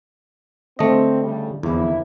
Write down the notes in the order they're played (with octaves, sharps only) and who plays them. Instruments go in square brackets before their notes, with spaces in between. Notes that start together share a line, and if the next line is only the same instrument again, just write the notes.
[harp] D3 [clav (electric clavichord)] A3 D#5 [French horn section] C4
[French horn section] A2 C#3 G3
[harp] F1 A#3 [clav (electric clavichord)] E2 [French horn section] E4